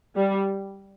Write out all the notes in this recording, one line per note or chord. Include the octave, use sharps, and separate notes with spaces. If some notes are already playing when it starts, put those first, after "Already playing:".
G3